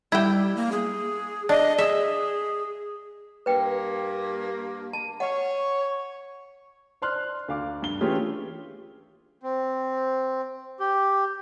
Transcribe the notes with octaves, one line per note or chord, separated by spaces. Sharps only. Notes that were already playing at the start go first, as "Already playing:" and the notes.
G3 E4 G5
A#3
G#4
D4 D#5
G#4 E5
G2 A#3 B4 G5
A5
C#5 F#5
C5 D5 C6 F6 F#6
D2 F5 D6
G2 G7
E3 A3 C#4 F4 G4 G#4
C4
G4